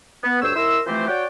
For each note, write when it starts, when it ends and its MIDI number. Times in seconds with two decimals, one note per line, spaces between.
0.24 0.39 59
0.42 0.55 38
0.42 0.55 43
0.42 0.55 72
0.42 0.55 73
0.42 0.55 88
0.55 0.80 39
0.55 0.80 64
0.55 0.80 70
0.55 0.80 84
0.55 0.80 88
0.87 1.05 52
0.87 1.05 53
0.87 1.05 57
0.87 1.05 60
0.87 1.05 67
0.87 1.05 72
1.08 1.26 66
1.08 1.26 73
1.08 1.26 74
1.08 1.26 78
1.08 1.26 79